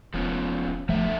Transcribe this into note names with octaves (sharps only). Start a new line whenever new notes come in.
E1 F3 B3 C#4
F1 B2 D3 F3 F#3 A3 E5